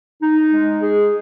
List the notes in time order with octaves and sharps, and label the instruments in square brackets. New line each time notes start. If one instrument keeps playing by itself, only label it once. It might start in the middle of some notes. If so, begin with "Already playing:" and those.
[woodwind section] D#4
G#3
G#4